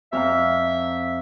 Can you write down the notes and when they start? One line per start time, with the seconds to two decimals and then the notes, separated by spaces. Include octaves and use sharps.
0.13 F2 E5 F5 A#5